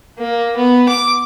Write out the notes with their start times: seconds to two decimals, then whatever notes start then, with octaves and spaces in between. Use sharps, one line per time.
0.18 A#3
0.57 B3
0.89 D6